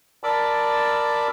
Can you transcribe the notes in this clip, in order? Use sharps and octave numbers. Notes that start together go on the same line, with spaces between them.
A#4 D5 A5 B5 D6 E6